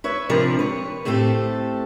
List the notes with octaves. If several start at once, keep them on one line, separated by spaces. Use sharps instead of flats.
B4 C#5 E5
C3 F3 D4 A#4 B4
B4 C#5
A2 A3 C4 G4 A4